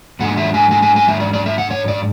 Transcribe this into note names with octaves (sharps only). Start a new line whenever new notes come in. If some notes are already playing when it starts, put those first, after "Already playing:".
G#2 G#3 D4 F#5
E5
G#5
G#5
G#5
G#5
E5
D5
D5
E5
F#5
C#5
D5